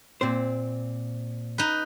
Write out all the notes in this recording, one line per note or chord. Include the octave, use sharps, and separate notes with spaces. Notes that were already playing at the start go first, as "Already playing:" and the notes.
A#2 C4 C5
D#4 B4